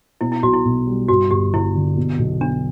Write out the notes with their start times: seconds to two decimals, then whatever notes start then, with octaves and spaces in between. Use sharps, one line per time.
0.21 B2 E4
0.32 E4
0.43 B1 F#4
0.53 E4
0.65 B1
0.87 G3
1.09 G2 F#4
1.31 G1 G4
1.53 G1 E4
1.75 D3
1.97 B2
2.19 B1
2.41 B3 D4